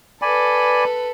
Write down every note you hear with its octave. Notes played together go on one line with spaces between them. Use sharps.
A4 B4 D5 G#5 B5